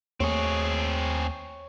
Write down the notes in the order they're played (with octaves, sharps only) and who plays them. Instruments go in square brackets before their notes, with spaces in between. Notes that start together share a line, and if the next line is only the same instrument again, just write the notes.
[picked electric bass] D#2 A3 A#3 [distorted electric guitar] C4 G#4 [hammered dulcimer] C#5